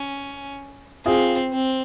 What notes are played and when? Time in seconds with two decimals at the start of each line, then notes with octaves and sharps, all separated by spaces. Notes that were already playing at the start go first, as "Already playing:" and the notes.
Already playing: C#4
1.06 C4 F4 G#4
1.53 C4